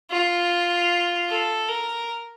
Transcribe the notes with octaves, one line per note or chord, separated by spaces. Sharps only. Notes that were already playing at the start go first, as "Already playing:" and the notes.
F4
A4
A#4